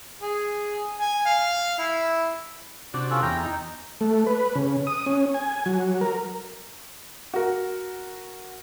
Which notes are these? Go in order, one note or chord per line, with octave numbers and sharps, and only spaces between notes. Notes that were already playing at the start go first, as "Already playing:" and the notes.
G#4
G#5
F5
E4
C3 D4 F#4 D5
C#4 F4 A4
E2 G5 A#5
D#4
A3
B4
C#3
D#6
C#4
G#5
F#3
A#4
F#4 A#4